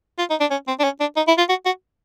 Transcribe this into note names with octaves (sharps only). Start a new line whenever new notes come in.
F4
D#4
D4
C#4
C4
D4
C#4
D4
D#4
E4
F4
F#4
F#4